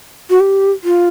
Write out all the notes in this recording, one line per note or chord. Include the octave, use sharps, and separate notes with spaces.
F#4
G4
F4